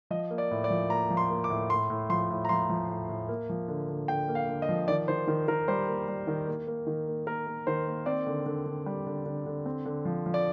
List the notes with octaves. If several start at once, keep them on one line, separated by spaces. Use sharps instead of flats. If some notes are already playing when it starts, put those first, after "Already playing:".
F3 D#5
A#3
D5
A2
D5
F3
A#3 A#5
F3
C6
A#3
D6
A2
A2 C6
A2
F3 C6
A2
A#5
F3 C6
F3
A2
A2
A#3
F3
D3
D3
D3 G5
A#3
F5
D3
D#5
F3
D#3 D5
D#3 C5
D#3
D#3 A#4
G3 C5
A#3
G3
D#3
A#3
A#3
D#3
A#3
A#3 A#4
A#3
D#3 C5
A#3
C4 D5
D3
D3
D3
G3
D3
D3
D3
C4
D3
F3
F3
D5